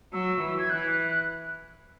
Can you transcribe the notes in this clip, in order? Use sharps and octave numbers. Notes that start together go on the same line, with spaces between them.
F#3 E6
E3
G#6
E3 F#6